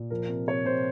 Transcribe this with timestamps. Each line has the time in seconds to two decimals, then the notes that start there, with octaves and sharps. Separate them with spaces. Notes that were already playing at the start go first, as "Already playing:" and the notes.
Already playing: A#2
0.10 F3 A#4
0.29 C3
0.47 C3 C#5
0.65 C3 C5